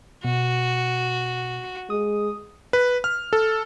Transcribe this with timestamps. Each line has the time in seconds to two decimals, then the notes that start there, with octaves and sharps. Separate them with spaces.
0.24 B2 F#4
1.90 G#3 D#6
2.73 B4
3.04 F6
3.33 A4